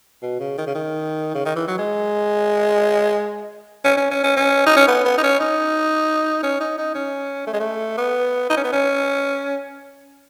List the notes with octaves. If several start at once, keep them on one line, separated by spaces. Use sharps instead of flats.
B2
C#3
D#3
C#3
D#3
C#3
D#3
E3
F#3
G#3
C#4
C#4
C#4
C#4
C#4
D#4
C#4
B3
B3
D#4
C#4
D#4
C#4
D#4
D#4
C#4
A3
G#3
A3
B3
D#4
C#4
B3
C#4